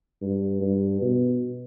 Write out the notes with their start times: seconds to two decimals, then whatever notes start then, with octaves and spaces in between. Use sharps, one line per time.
0.22 G2
0.61 G2
1.02 B2